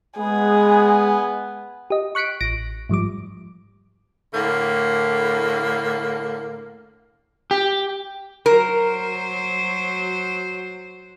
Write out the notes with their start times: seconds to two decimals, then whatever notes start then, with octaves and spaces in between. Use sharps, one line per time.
0.19 G#3 B3 G#4
1.90 G4 D#5
2.15 C#6 F#6 B6 C#7 D7
2.41 A1 A#6 D7
2.89 G#2 F3 G3 D6
4.34 A2 D3 A#3
7.51 G4
8.46 F#3 A#4 C5